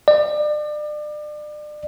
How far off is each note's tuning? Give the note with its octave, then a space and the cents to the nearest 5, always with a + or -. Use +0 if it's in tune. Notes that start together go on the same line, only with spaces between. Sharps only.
D5 +35